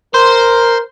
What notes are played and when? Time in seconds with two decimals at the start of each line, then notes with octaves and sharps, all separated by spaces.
0.14 A#4 C5